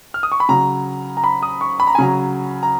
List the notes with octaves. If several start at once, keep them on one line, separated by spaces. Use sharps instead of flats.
F6
D#6
C#6
B5
C#3 F#3 A#5
A#5
B5
D#6
C#6
B5
A#5
G#5
C#3 F#3 A#5
A#5